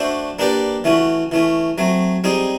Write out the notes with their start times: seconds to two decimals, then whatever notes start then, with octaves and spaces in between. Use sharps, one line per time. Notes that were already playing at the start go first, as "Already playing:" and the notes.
Already playing: A3 D4 F#4 A4 C5
0.39 A#3 D4 G4 B4 D5
0.84 E3 A3 C#4 F#4
1.31 E3 A3 C#4
1.78 F#3 A3 C4
2.24 G3 C4 D#4 G#4